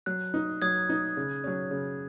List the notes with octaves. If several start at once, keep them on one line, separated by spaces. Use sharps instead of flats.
F#3 F#6
D#4
F#3 D#6 G#6
D#4
C#3
F#3 C#4
C#3